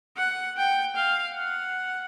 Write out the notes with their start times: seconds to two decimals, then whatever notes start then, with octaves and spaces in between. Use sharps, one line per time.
0.17 F#5
0.57 G5
0.96 F5
1.37 F#5